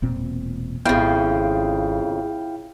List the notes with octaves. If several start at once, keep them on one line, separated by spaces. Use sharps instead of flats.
E1 A#2 C4
G#1 F2 C#3 B3 E4 F5 G5